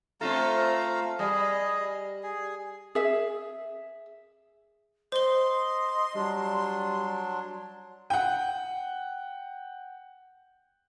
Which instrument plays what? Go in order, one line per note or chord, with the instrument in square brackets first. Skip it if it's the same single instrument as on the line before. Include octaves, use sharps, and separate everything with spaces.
[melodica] A3 F5 A#5 [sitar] C4 F4 A4
[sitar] G3 [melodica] G#4 D#5
[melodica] G#4
[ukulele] G#4 E5
[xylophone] C5 G7 [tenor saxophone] D#5 [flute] C6
[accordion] F#3 D4 [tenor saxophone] G3
[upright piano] F#5 G5